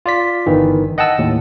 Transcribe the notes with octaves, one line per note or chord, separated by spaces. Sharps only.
F4 D5 B6
G1 D#3 E3
D#5 F#5 G5 A5 E6
D#2 A2